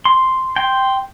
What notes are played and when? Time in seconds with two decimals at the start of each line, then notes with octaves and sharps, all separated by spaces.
0.05 C6
0.56 G5 C6